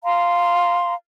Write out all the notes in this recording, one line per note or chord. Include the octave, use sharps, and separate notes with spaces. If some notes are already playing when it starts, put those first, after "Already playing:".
F5 A#5 C6